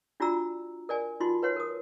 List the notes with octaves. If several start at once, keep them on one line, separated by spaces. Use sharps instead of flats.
D4 F4 F#4 D5 A#5 E6
A#4 D5 G#5
D#4 F4 F#4 C6
B4 C#5 F#5 C6
A#4 D#6